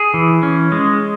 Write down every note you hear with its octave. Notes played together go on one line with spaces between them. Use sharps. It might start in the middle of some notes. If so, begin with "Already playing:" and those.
Already playing: G#4
E3
C#4
G#3